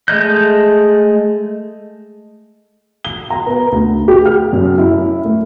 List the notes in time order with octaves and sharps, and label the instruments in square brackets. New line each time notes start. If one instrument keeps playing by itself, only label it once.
[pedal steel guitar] G#3 A3 D#5 G6
[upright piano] G7
A#5
B3
D2
G4
F6
F#2
E4
A3